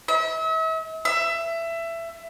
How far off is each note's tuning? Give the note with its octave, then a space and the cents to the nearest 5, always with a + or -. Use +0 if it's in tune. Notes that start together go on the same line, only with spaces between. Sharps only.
E5 -40
E5 +20